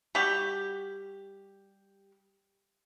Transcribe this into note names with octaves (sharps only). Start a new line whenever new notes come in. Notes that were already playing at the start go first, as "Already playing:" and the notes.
G3 F#4 G4